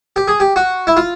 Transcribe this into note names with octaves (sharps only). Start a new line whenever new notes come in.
G4
G#4
G4
F#4
E4
F4